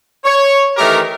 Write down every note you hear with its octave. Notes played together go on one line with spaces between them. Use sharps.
C#5
D#3 E3 A3 G4 A#4